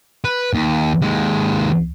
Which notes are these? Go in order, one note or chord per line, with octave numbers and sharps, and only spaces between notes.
B4
D#2
D#2 G#3